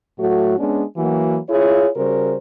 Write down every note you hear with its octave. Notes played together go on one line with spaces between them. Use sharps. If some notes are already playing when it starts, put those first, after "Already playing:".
A2 F#3 A3 F#4
G#3 B3 C#4 D4
E3 F#3 A#3 F#4
E4 F4 G#4 C#5
C#3 G3 F#4 A#4 C5